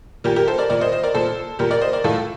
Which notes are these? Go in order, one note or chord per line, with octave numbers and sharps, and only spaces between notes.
A#2 G4 A#4
G4 A#4
A4 C5
A#4 D5
A#2 A#4 D5
C5 D#5
C5 D#5
A#4 D5
A#2 A4 C5
A#2 G4 A#4
A#4 D5
C5 D#5
A#4 D5
A2 F4 A4